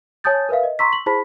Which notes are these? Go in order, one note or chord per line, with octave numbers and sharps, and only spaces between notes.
C#5 G#5 A5 D#6 G6 A6
A#4 B4 E5 F5
D#5
A#5 C6 C#6 E6 B6
F#7
E4 G#4 C5 A5 B5 B6